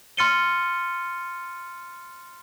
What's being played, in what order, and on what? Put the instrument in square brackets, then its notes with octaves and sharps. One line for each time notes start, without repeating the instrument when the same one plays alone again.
[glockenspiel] C6 F6 A6 C#7 D#7 G7